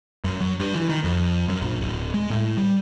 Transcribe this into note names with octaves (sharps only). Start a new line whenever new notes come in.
F#2
F#3
G2
E3
D#3
F2
F#2
A#1
D1
G#3
A2
G3